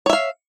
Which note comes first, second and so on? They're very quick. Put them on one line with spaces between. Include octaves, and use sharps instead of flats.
C#5 E5 F5